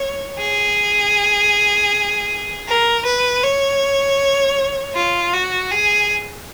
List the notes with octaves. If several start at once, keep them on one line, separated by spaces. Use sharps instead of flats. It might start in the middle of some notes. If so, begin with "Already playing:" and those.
Already playing: C#5
G#4
A#4
B4
C#5
F4
F#4
G#4